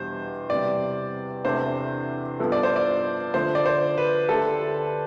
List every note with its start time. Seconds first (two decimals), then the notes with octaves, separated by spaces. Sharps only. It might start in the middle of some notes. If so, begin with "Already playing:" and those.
Already playing: E2 B2 G3 D4 G4 C5
0.50 E2 C3 G3 D5
1.45 E2 C3 E3 A3 D4 C5
2.39 G2 F3 B3 E4 A4
2.52 D5
2.63 C5
2.76 D5
3.34 D3 F3 A3 C5
3.55 D5
3.66 C5
3.98 B4
4.29 D2 D3 A3 D4 G4 A4